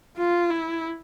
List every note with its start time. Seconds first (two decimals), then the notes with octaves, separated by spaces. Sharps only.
0.17 F4
0.50 E4